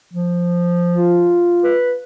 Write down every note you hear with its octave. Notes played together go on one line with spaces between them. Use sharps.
F3
F4
B4